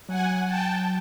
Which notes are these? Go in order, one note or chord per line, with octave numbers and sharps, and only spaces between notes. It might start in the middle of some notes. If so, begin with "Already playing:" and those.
F#3 F#5 G#5
G5 A5